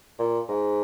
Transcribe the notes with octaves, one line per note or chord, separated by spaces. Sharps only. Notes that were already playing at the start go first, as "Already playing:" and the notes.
A#2
G#2